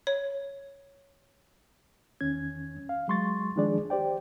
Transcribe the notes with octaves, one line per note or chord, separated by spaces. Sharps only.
C#5
E2 D#3 C#4 G#6
F5
F#3 G#3 C6 C#6 A6
D#3 F3 G#3 D4 G#4 D5
G4 C5 D5 G5